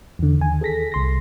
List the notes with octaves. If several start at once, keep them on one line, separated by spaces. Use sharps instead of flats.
E2 D3
D#2 G#5
G#4 A4 A#6 B6
C2 C6 A#6